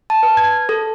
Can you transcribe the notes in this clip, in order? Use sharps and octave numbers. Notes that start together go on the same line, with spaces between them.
A5
B4
G#6
A4